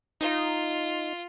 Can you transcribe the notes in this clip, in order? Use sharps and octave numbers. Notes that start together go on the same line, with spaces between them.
D#4 F4